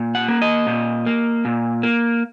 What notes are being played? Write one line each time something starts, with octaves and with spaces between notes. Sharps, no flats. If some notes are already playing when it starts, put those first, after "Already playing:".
Already playing: A#2
F#5
A#3
D#5
A#2
A#3
A#2
A#3